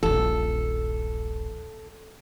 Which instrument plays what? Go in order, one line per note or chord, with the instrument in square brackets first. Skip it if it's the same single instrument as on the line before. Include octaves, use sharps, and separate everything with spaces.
[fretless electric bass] D#1 A#1 [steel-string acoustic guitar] A4